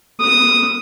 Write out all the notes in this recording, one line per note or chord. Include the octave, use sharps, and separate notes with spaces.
D#6